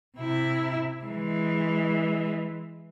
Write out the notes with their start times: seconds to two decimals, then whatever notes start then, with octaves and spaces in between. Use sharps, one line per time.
0.17 C3 E4
1.04 E3 G#3